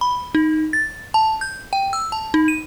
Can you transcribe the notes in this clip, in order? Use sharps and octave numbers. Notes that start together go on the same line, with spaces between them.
B5
D#4
A6
A5
G6
G5
E6
A5
D#4
D#7